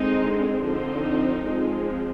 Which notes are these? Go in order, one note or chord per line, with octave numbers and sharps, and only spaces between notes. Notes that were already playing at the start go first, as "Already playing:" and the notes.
Already playing: D3 G#3 C4 D#4
D3 F3 C4 D#4
F3 G#3 C4